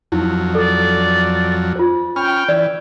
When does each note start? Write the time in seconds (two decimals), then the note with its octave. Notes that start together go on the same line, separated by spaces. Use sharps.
0.12 F2 F#3 D#4 E4
0.55 A4 D5
1.76 F4 C5
2.16 C#4 G5 B5 F6
2.49 E3 D5